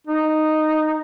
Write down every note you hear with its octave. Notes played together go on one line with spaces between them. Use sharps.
D#4